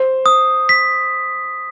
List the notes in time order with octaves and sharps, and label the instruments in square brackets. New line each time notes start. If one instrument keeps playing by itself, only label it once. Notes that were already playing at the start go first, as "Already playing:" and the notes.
Already playing: [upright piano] C5
[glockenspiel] D#6
B6